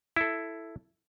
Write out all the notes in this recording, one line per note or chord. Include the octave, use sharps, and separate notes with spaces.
E4 A4